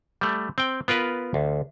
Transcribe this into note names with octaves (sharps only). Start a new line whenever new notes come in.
G3 A3
C4 G5
B3 F4 A#4 B4
D2